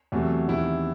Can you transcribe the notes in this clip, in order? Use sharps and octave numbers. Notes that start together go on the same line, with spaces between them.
E2 C3 F#3 A3
E2 C3 D#3 E4